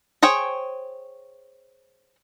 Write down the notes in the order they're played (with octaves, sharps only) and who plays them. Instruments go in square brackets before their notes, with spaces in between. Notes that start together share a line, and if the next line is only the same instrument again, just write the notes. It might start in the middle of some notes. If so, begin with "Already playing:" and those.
[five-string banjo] G#4 C5 C#5 G5